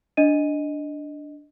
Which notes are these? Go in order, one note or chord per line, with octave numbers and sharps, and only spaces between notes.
D4 D#5 D#7